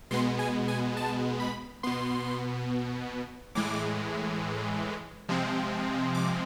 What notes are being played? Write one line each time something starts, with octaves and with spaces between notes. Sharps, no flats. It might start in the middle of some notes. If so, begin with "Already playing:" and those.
B2 G#3 B3 C6
G#5
G#5
A5
B5
B2 B3 C6
A2 E3 G#3 D6
C3 F3 G#3 C4
D6